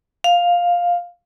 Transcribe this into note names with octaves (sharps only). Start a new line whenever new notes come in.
F5